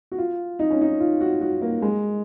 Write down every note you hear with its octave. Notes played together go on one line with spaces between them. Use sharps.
F#4
F4
D#4
C#4
D#4
F4
F#4
F#4
A#3
G#3